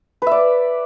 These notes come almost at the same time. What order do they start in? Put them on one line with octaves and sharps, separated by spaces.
B4 E5 D5